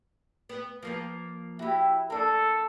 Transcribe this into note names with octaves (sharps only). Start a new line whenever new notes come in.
B3
F3 A#3 B4
E4 F#4 G4
A#3 D4 A4